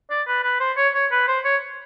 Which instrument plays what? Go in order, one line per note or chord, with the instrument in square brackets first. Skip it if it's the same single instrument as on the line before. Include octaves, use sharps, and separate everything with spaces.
[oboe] D5
B4
B4
C5
C#5
C#5
B4
C5
C#5